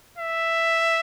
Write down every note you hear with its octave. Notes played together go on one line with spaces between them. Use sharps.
E5